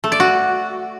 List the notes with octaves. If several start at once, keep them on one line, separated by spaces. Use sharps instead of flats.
A3
D5
F#4